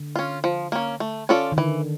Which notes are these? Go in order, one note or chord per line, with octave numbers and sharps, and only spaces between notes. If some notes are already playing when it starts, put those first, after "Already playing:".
Already playing: D3
C#4 F4
F3
A#3 C#4
A3
C#4 F4 A4 D5
D#3
D3 E3